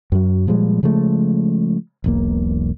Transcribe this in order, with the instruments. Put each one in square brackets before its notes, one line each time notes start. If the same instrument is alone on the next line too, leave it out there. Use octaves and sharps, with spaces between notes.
[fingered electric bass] F#2 F#3
A#2 F3 G3 G#3
C#3 F3 G#3 A3
E1 B1 A#3